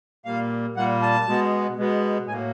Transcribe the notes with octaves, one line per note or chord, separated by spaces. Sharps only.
A#2 G3 A#3 F5
A#2 G3 A#3 F#5
A5
B2 G#3 B3
B2 G#3 B3
A2 F#3 A#3 G#5